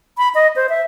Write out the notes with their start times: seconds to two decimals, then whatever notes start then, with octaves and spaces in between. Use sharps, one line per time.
0.18 B5
0.35 D#5
0.56 C5
0.69 E5